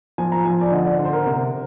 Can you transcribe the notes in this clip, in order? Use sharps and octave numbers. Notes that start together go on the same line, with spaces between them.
F3 G#5
A#5
F3 G#5
D5
D3 D#5
D5
D3
C5
A#4
C3